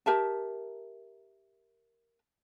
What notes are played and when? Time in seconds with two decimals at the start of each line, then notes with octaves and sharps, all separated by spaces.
0.06 G4 A#4 E5 A5